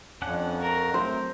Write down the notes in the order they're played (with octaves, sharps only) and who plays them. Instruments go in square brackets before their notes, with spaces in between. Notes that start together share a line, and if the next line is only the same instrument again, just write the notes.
[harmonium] F2 [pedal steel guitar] C#4 D4 F#5
[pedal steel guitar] F#4 [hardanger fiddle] A#4
[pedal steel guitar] F#3 A3 C4 [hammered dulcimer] C5